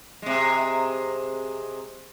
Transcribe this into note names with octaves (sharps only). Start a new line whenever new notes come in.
C3 G#3